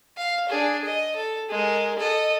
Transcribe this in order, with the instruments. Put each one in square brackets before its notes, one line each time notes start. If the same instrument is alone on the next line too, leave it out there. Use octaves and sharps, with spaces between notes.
[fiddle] F5
D4 G#4
D#5
A4
G#3 A#4
A4 D#5